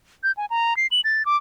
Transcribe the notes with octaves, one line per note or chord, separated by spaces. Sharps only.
G6
G#5
A#5
C7
F#7
A6
D6